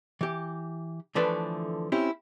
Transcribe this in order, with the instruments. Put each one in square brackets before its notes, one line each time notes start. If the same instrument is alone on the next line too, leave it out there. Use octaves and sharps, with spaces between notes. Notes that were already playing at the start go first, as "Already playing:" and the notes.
[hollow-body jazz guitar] E3 G4
D3 E3 F3 A3 D4 B4
C4 C#4 E4 G4